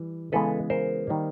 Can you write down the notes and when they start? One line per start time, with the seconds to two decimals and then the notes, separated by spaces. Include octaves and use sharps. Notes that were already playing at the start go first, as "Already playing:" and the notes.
Already playing: E3 G3
0.32 C#3 E3 G#3 B3 A4 B4
0.70 A#4 C5
1.07 D#3 G3 A#3